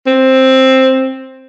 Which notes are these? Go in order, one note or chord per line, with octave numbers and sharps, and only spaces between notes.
C4